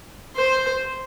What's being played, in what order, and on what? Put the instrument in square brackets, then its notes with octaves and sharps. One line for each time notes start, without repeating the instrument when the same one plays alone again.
[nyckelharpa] C5